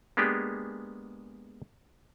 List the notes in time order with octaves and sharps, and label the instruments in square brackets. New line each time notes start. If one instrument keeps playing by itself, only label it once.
[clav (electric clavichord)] G#3 A#3 B3 D4 G4 G#4